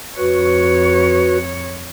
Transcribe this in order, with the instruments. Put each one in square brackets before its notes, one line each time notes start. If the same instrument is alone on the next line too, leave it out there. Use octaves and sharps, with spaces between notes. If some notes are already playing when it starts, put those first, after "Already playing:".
[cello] F2 C#5 [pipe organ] F#4 B4